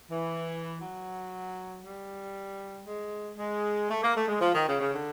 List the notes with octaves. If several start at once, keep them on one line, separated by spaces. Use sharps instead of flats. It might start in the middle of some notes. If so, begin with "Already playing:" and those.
E3
F#3
G3
G#3
G#3
A3
A#3
A3
G#3
F3
D#3
C#3
C#3
D3